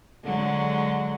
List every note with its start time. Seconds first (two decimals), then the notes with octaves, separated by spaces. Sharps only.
0.24 D3 F#3 G#3